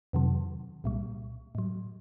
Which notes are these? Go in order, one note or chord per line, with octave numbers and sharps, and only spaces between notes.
F2 C3 D#3 F#3
C2 A#2 G3
A2 F#3